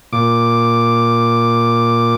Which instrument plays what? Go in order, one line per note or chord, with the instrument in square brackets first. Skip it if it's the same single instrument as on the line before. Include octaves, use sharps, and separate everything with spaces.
[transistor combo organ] A#2 D6